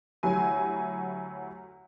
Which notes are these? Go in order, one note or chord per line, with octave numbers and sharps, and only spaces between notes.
D2 F#3 E4 G4 G#5